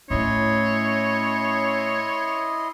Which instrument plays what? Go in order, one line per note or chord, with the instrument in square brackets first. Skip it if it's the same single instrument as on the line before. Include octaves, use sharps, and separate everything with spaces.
[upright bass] A2 A3 [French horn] C#4 [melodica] E4 D#5 C6 [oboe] C#5